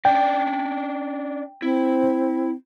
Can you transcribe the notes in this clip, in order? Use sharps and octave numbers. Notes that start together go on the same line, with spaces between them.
C#4 D4 D5 G5
C4 E4